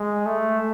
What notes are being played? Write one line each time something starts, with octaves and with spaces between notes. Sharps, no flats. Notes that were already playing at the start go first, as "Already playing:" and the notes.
Already playing: G#3
A3